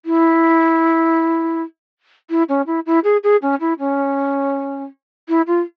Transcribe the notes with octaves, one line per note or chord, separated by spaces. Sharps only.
E4
E4
C#4
E4
E4
G#4
G#4
C#4
E4
C#4
E4
F4